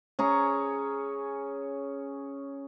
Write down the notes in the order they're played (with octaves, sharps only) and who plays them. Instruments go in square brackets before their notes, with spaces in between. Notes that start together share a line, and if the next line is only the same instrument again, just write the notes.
[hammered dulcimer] C#4 G#4 A#5